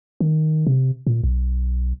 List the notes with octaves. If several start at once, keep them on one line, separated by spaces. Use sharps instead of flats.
D#3
C3
A#2
B1